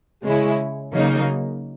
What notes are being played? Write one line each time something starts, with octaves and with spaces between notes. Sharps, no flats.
C#3 G#3 C#4 E4
C#3 F#3 A#3 D#4